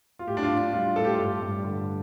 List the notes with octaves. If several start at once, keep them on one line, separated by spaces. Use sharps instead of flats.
F4
A2 G4
D4
F4
A2
D4
G3 F4
A2 A4
G4
F4
G2 G4
G2
D3